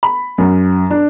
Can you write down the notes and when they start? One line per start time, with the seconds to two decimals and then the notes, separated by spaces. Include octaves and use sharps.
0.03 B5
0.38 F#2
0.90 D4